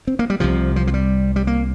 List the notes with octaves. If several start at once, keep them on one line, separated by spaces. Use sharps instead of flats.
C4
A#3
G3
C2 C3 F3
F3
F3
G3
G3
A#3